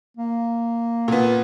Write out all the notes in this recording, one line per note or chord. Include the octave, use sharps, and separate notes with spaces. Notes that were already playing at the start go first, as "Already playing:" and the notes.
A#3
A#2 B3